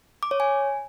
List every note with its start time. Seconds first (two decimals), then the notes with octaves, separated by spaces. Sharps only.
0.23 D6
0.31 C#5
0.40 G#5